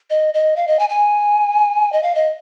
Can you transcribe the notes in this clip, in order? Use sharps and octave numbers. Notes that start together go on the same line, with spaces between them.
D#5
D#5
F5
D#5
G#5
G#5
D#5
F5
D#5